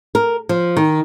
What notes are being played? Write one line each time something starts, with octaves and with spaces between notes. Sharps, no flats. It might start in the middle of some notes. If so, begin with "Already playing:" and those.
A#4
F3
D#3